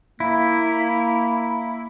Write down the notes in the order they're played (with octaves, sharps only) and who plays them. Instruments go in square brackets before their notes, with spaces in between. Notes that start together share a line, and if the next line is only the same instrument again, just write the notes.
[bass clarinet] A#3 [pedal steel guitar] E4